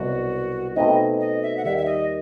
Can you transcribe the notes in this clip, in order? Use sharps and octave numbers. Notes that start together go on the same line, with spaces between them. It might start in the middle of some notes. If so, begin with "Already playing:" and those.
Already playing: C2 B2 F#3 F#4
B2 A3 C4 D#4 D#5
D#5
E5
F#5
D#2 D#3 G3 E5
E5
D#5